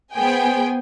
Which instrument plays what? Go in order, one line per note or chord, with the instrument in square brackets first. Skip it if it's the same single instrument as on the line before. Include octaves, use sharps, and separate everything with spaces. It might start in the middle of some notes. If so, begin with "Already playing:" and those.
[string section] B3 G#4 C5 G5 G#5